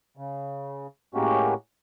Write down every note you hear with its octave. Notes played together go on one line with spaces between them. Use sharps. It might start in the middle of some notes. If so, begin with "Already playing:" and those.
C#3
A2 G#3 A#3 C#4 F#4 G4